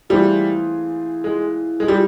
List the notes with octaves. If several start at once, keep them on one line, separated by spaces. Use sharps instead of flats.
E3 G3 A3 C4 F4 G#4
G#3
G#3
G3